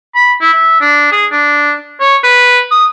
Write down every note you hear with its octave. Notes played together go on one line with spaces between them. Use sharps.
B5
E4
E5
D4
G#4
D4
C#5
B4
D#6